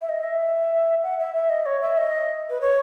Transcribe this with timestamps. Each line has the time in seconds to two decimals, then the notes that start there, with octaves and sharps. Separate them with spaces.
0.02 E5
0.09 D#5
0.24 E5
1.03 F#5
1.19 E5
1.34 E5
1.49 D#5
1.66 C#5
1.82 E5
1.98 D#5
2.50 B4
2.61 C#5